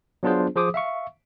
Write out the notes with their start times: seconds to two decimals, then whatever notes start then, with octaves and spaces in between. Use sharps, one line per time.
0.23 F#3 B3 D4 F4 G#4 C5
0.56 F3 G#4 C5 D6 D#6
0.74 E5 F5 C#6